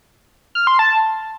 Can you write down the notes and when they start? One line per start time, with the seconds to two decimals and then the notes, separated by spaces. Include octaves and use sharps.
0.55 F6
0.67 C6
0.79 A5